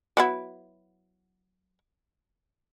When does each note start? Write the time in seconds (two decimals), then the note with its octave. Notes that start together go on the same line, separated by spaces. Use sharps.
0.17 F#3 B3 E4